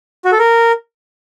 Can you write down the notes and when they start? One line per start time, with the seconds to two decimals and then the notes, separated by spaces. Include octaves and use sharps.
0.25 F#4
0.32 A4
0.39 A#4